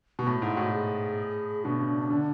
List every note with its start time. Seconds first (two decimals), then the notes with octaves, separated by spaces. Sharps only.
0.19 B2
0.26 A2 F#4
0.42 G#2 E4
0.57 A2 F#4
0.73 G#4
1.64 B2 D4
1.80 C#3
2.10 D3